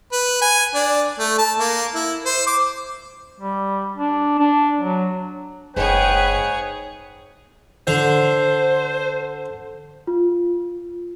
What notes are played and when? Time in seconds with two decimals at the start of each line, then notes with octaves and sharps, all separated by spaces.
0.12 B4
0.41 G#5
0.75 D4
1.19 A3
1.38 A5
1.59 A#3
1.95 E4
2.25 C5
2.47 D6
3.40 G3
3.97 D4
4.38 D4
4.81 F#3
5.76 F#1 G#2 G#4 B4 C#5 G5 G#5
7.87 D3 C5
10.07 F4